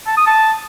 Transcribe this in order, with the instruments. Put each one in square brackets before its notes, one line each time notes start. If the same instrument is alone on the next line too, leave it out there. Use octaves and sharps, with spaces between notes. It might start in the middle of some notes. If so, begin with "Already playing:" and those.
[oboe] A5
D#6
A5